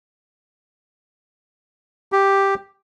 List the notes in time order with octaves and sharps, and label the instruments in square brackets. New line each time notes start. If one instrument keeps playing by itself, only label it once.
[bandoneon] G4